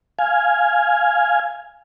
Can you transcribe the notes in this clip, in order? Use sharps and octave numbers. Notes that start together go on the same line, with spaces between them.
F5 G#5